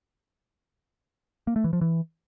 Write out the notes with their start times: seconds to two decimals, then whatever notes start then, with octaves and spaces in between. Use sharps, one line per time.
1.47 A#3
1.56 A3
1.64 E3
1.73 F3
1.81 E3